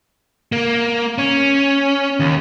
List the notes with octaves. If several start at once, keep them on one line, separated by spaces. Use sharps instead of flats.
A#3
C#4
D#2